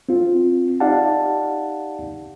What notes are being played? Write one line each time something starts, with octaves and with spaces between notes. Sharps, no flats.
C4 F4
D#4 G4 D5 F5 F#5 A5